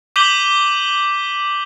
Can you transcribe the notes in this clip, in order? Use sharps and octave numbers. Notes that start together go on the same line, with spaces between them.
D6 G6 B6 D#7 F#7 G7